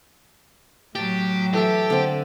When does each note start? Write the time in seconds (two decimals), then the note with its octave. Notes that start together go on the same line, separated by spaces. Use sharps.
0.95 A2 F#3 G4 A5
1.54 E3 G4 A4 E5
1.90 D3 C4